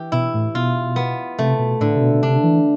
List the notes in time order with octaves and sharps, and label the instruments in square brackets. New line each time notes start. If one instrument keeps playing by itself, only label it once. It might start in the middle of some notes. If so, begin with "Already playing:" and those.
Already playing: [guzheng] E3 G4
[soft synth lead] B2 [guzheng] E4
[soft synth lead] A2
[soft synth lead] B2 [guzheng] F4
[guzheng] B3
[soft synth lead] C3 [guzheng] A3
[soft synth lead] B2
[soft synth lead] A2 [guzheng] D3
[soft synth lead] C3
B2
B2
[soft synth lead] C3 [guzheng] D4
[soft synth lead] E3